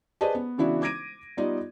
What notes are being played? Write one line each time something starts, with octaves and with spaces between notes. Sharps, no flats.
G#4 B4 C5 D5 D#5 A5
B3
C#3 E3 B3 D4 E4 F#4
D6 G#6 A#6 D7 D#7
G3 B3 D#4 F4 D5 D#5